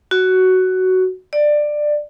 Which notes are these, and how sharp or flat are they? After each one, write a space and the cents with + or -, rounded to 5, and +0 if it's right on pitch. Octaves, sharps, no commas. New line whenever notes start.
F#4 +10
D5 +15